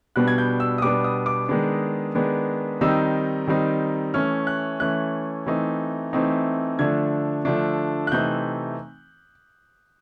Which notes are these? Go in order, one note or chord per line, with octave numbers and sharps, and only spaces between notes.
B2 G3 B3 D4 F#6
G#6
G6
E6
D#6
B2 G3 B3 D4 D6
D#6
D6
D#3 G#3 B3 D4
D#3 G#3 B3 D4
D#3 G3 C4 D#4 E6
D#3 G3 C4 D#4
E3 A3 C#4 F6
F#6
E3 A3 C#4 F#6
E3 A3 C4 D#4
E3 A3 C4 D#4
D3 F3 A3 D4 G#6
D3 F3 A3 D4
F#6
C3 E3 A3 C4 D#4 G6